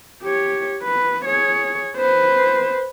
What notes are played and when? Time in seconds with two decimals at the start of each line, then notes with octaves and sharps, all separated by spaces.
0.23 G4 C#5
0.83 B4
1.26 G#4 C#5
1.97 B4 C5